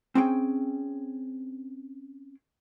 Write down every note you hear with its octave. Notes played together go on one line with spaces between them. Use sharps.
C4 C#4 G#4 G5